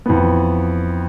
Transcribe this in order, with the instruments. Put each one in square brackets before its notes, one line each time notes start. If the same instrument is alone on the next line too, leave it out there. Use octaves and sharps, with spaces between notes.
[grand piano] F2 E3 B3